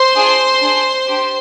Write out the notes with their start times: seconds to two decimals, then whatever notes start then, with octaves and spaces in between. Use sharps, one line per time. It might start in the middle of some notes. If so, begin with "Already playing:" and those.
Already playing: C5 C6
0.15 D4 F4 G#4
0.61 D4 G#4
1.08 D4 G4